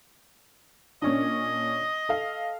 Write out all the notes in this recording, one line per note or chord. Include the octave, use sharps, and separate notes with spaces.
A#2 C#4 D4 D#5
A4 F5